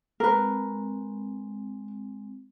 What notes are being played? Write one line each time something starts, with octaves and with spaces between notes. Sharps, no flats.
G#3 C4 A#4 B4